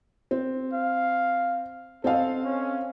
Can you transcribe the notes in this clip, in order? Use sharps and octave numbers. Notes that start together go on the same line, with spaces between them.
C4
F5
C4 A4 D#5 F5
C#4